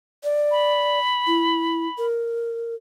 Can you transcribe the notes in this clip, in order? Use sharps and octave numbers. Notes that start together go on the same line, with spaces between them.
D5
B5
E4
A#4